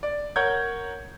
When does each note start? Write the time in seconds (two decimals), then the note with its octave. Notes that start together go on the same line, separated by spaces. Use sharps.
0.03 D5
0.36 A#4 C#5 F#5 G6 G#6